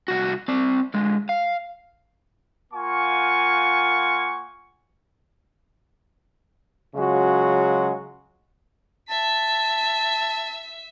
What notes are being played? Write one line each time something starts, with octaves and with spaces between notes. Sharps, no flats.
C2 F#4
C4 D5
D3 G#3
F5
A#3 F4 F#5 G#5 C#6
C#3 F#3 G#3 F4 F#4
E5 A5 B6